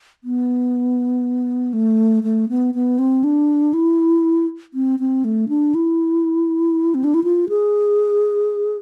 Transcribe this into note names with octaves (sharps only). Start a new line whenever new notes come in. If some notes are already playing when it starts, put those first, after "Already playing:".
B3
A3
A3
B3
B3
C4
D4
E4
C4
C4
A3
D4
E4
C4
D4
E4
F4
G#4